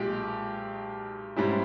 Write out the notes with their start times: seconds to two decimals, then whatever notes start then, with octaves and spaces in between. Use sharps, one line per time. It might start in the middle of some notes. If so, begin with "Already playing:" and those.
Already playing: B1 A#2 G#3 G4
1.36 G#2 G3 C#4 E4 G4